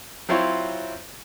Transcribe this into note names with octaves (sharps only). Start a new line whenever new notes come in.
F#3 C4 E4 F4 C#5